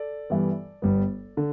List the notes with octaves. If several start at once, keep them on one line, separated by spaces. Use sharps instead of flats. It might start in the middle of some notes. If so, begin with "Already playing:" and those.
Already playing: A4 D5
G2 E3 G3 B3
G1 G2 G3 B3
D3